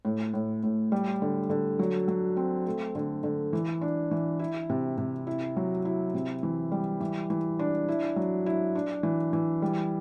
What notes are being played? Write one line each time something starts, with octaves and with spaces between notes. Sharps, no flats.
A2
A2
A2
G3
D3
D3
F#3
F#3
C4
A3
D3
D3
E3
D4
E3
E4
C3
C3
E4
F#3
E4
C3
E3
G3
E3
E3
D4
E4
F#3
E4
D4
E3
E3
G3